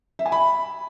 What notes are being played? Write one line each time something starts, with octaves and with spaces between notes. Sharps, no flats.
E5
G#5
B5